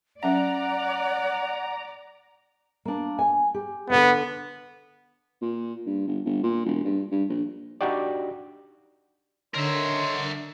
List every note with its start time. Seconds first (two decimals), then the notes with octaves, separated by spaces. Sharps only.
0.23 F#3 C#4 D5 E5 F#5 A#5
2.85 A#3 D4
3.19 G#5
3.54 G4
3.90 D3 B3 C#5 F#5
5.42 A#2
5.86 G2
6.07 G1
6.25 G1
6.43 A#2
6.66 E1
6.85 G2
7.11 G2
7.29 A#1
7.81 D4 D#4 F#4 G4 D5
9.55 D3 D#3 A#4 C#5 E5 C6